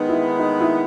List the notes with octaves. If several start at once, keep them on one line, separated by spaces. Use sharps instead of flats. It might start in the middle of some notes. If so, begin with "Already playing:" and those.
Already playing: D#3 G#3 B3 D#4
E4
D#4
E4